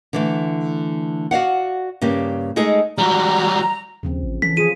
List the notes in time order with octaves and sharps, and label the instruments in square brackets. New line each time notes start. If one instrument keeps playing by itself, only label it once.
[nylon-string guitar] D3 E3 A3
F#4 D5 F5 F#5
G2 C#3 A#3 G4
G#3 A3 D#4 G#4 A4 D#5
[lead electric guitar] F#3 G3 [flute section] A#5
[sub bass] D#2 [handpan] C#3 F3 C4
[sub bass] A1
[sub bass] E3 [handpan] C#4 A4 [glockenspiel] B6
[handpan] F3 F4 [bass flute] G#4 [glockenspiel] D#7